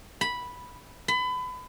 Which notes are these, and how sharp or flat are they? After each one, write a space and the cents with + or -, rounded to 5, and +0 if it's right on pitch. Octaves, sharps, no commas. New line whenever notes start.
B5 -5
B5 +30